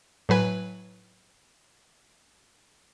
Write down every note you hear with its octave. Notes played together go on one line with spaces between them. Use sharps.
A2 F#3 B4 G#5